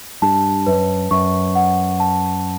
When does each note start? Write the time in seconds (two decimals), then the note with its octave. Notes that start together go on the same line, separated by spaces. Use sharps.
0.22 G2 A5
0.66 F#2 B4
1.11 F#2 C#6
1.55 F#5
2.00 A5